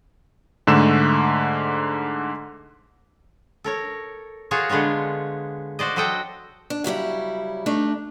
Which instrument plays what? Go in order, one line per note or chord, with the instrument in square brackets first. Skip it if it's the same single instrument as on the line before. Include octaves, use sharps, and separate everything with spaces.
[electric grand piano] G#2 D3 A3 E7
[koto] A4 A#4 C#5
F4 F#4 G#4 A#4 C#5
D3 G#3 B3 F4 C#5
F#4 C5 D5 D#5
F#3 F#4 A4 D#5 F#5 G5
[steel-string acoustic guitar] D4
C#3 F#3 G3 E4
A3 D4 D#4